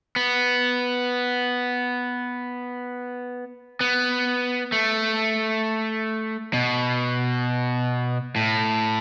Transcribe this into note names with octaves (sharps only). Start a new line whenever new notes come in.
B3
B3
A3
B2
A2